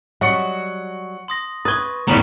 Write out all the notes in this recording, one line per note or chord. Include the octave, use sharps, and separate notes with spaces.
F#3 G3 D#5 F#5 C#6 C#7
C6 D#6 A#6
B4 C#6 D#6 G#6 A6
D#1 A2 D#3 G3 B3 D#4 A#5